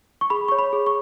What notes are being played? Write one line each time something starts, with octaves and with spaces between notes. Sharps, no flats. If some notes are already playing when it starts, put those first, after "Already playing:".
C#6
G#4 B5
C#5 C#6
B5
G#4
C#6